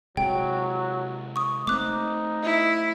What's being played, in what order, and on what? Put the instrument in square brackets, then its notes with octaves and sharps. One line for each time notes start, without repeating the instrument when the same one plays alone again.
[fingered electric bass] C3 G#3 [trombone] F#3 [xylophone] G5
[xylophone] C#6 D#6
[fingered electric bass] A3 C4 [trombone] D#4 [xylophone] D6 F#6
[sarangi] E4